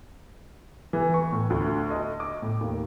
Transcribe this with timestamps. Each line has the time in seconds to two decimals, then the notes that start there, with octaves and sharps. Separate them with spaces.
0.93 E3
1.14 C#6
1.32 A2
1.50 D2
1.90 D#5
2.20 D6
2.42 A2
2.61 D#2